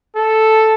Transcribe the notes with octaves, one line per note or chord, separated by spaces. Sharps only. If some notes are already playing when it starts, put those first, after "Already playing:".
A4